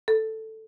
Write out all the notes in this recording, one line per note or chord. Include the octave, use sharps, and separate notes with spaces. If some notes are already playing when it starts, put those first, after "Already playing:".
A4